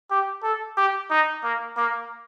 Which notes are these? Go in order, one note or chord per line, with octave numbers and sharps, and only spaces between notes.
G4
A4
G4
D#4
A#3
A#3